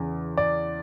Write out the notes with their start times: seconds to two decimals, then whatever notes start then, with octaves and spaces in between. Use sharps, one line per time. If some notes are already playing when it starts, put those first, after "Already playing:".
Already playing: E2 C#3
0.37 D5